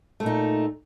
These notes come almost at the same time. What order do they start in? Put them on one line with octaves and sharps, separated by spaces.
A3 A#2 D#4